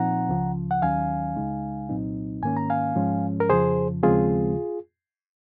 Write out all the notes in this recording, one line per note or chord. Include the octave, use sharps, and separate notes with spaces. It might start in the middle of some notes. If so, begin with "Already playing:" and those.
Already playing: A#2 F3 C4 D#4 F#5 A#5
C#2 C#3 F3
F#5
D#2 D#3 F#3 C#4 F5 G#5
C#2 C#3 G#3 D#4
C2 A#2 F#3 C4 D#4
G#2 D#3 A#3 C#4 G#5
A#5
F5 G#5
G#2 F3 G#3 C#4
A#4
F2 C#3 F3 G#4 C5
D#2 C#3 F3 G#3 C4 F4 G#4